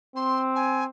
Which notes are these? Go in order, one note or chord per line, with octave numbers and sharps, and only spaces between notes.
C4 C6
G#5